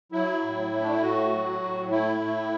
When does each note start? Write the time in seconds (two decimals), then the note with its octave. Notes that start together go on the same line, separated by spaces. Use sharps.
0.12 F#3 E4
0.43 A2
0.72 A3
0.81 D4
0.91 E4
1.02 A2 F#4
1.32 F#3
1.62 A2
1.91 A3 E4
2.21 A2